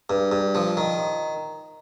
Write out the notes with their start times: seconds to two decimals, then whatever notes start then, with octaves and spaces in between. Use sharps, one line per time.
0.10 G2
0.32 G2
0.55 F3
0.77 D#3